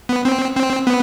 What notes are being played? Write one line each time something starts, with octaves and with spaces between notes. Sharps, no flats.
B3
C4
C4
B3